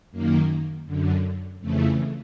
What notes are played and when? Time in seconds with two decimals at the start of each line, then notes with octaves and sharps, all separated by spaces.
0.11 F#2 D#3 A#3
0.85 F#2 D3
1.60 F2 C#3 E3 A3